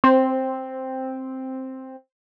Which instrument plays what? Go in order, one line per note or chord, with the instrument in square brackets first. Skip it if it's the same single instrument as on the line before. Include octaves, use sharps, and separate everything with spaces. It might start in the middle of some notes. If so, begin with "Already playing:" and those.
[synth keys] C4 [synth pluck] C5